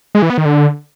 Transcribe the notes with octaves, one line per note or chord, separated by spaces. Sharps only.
G#3
E3
B3
D#3
D3